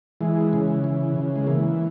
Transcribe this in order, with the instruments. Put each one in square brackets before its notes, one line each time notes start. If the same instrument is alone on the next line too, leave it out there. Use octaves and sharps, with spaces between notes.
[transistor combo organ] E3 G#3
C#3
E3
C#3
G#3
E3 A#3